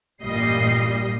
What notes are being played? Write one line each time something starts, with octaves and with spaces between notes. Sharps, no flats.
A1 G2 A#2 G3 D#5 C7